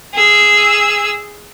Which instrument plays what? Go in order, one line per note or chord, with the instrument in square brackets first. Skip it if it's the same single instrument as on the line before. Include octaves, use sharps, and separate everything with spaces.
[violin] G#4 E6